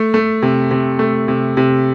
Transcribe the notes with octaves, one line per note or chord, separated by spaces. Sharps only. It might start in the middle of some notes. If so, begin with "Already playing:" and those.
Already playing: A3
A3
C3
C3
A3
C3
C3